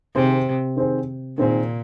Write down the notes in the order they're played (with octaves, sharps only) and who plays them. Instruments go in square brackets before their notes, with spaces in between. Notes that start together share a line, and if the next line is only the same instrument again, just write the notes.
[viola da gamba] C3 [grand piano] D#3 C4 G#4 C5
[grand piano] D#3 C4 G#4 C5
[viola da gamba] A#2 [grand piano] D#3 C4 G#4 C5